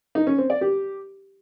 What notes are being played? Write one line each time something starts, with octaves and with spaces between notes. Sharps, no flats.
D#4
C#4
C4
D5
G4